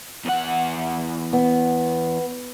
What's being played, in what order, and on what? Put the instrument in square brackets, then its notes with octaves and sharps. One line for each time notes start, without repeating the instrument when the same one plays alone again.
[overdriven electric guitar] E2 F#5
[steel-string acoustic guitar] B3